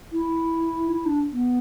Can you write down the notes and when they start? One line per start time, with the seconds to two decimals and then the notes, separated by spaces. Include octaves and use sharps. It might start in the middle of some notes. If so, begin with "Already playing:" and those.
0.12 E4
0.92 E4
1.05 D4
1.32 B3